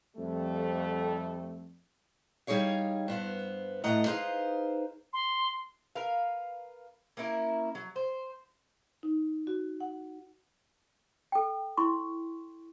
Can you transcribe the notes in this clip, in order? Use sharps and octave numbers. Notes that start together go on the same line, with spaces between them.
F2 G3 A3
G3 D#4 G#4 C#5 F5
G2 B3 C5
A2 A3 B4 D#5 F#5 A#5
D#4 G#4 B4 C5 F5
C6
A#4 B4 F5
A#3 C#4 E4 A#4
F#3
C5
D#4
F#4
F#5
A4 G5
E4 C6 C#6